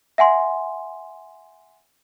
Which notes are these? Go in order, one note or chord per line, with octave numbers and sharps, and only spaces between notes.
E5 F#5 G#5 C6